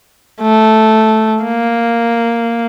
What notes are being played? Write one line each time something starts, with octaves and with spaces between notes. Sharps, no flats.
A3
A#3